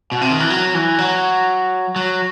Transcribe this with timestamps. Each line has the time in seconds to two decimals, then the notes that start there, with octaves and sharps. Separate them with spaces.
0.12 B2
0.21 C3
0.31 D#3
0.40 E3
0.50 F#3
0.75 E3
0.99 F#3
1.96 F#3